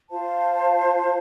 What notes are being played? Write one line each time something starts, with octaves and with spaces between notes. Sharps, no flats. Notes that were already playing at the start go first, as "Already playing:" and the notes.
F4 C5 F5 A5